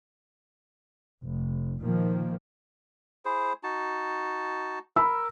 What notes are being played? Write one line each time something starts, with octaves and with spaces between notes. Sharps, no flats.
F1
A#2 D#3 F3 A#3
E4 G#4 C5
D#4 F#4 A5
A#4 B5 E6